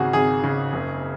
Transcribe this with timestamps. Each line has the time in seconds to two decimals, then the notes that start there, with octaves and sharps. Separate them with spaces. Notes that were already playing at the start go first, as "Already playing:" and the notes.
Already playing: G#1 C#3 F#4 G#4
0.13 G#1 G#4
0.44 C#3
0.73 F#1